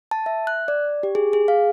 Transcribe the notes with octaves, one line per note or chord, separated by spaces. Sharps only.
A5
E5
F#6
D5
G4
G#4
G#4
F5